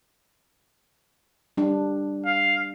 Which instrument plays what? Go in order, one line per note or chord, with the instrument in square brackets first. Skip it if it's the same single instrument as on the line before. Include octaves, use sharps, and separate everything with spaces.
[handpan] G3 D4
[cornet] F5